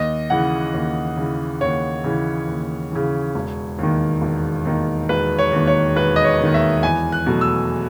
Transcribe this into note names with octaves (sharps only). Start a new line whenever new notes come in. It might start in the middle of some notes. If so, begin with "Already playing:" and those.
Already playing: D#2 D#5
C#3 E3 F#5
D#2
C#3 E3
D#2 C#5
C#3 E3
D#2
C#3 E3
E1
D#2 D#3
E1
D#2 D#3
E1 B4
C#5
D#2 D#3
C#5
E1 B4
D#5
C#5
D#2 D#3
E5
E2 G#5
F#6
B2 F#3 A3
E6